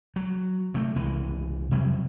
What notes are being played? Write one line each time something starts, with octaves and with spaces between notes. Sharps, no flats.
F#3
C3 A3
C2 E3 G#3
F1 C3 F#3 G3